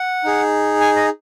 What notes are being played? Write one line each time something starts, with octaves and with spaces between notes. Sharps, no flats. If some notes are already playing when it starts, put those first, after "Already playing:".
Already playing: F#5
D#4 G#4
G#5
D#5